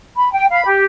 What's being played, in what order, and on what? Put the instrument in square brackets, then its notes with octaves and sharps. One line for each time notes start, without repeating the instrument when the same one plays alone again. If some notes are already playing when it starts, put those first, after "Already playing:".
[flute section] B5
G5
F5 B5
G4